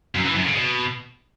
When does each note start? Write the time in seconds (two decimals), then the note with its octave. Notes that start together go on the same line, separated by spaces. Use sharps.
0.15 F#2
0.25 E3
0.35 F#2
0.45 C#3
0.55 B2